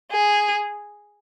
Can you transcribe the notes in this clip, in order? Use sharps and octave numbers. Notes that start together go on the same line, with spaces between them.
G#4